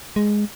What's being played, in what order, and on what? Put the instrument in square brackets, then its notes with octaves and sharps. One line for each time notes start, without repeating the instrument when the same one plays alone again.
[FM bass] G#3